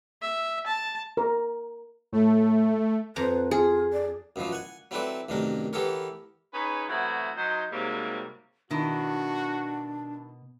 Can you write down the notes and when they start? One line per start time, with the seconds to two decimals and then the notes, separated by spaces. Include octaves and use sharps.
0.22 E5
0.66 A5
1.17 A#4
2.12 A2 A3
3.16 F2 B4 C5 A#5
3.51 F4 G#4
3.93 D5
4.36 F#2 B2 E3 F3
4.52 F#5 G#5
4.91 F#3 C4 E4 A4 B4 D5
5.29 A1 F#2 C3 D#3 D4 A#4
5.73 E3 B3 G4 A4 A#4 C#5
6.54 C#4 D#4 G#4 B4
6.89 E3 F#3 A3 B3 C4 F#4
7.36 F#3 D#4 C5
7.71 G#2 C3 F#3 G3 A#3
8.71 B2 D#3 D4 E4 F#4